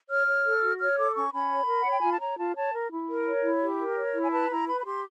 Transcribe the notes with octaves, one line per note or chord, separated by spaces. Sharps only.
C#5 F6
C#5
A4
F#4
C#5 F6
A4 D6
C#4 C#6
C#4 B5
C#5
A#4
F#5
C#5 G5
F4 G#5
A5
C#5 A#5
F4 A5
C#5 A5
A#4
E4
A#4
C#5
E4
G4
A#4
C#5
E4
G#5
B4 A5
E4 A#5
B4 B5
B5
G4 C6